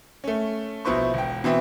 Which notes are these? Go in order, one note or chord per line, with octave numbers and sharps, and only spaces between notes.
A3 C#4
A#1 B2 E4 B4 C5 C#6
E1 G5
B2 E3 C4 E4